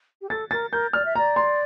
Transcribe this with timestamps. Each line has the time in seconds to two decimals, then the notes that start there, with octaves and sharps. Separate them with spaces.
0.21 G4
0.30 A4 A6
0.51 A#4 A6
0.72 A#4 G6
0.93 D5 F6
1.05 E5
1.15 D5 A#5
1.36 C6